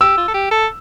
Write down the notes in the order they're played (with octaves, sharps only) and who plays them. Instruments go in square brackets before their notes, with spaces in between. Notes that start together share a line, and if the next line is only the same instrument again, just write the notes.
[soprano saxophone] G4 [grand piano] E6
[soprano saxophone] F4
A4
G4
A4